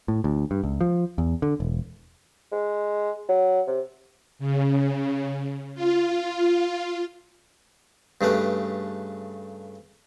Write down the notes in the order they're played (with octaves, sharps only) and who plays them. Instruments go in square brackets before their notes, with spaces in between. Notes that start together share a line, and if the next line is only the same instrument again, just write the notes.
[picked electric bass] A2
D2
G2
C#2
F3
E2
D3
E1
[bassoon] G#3
F#3
C3
[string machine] C#3
F4
[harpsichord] G2 C#3 A3 B4